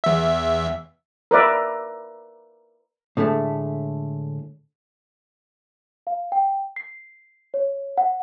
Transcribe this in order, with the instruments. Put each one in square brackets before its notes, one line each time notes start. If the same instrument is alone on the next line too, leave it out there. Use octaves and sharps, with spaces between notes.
[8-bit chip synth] E2 E5
[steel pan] A#4 B4 D5 E5
[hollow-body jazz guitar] A2 D3 G#3 A3
[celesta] F5
G5
C7
C#5
F#5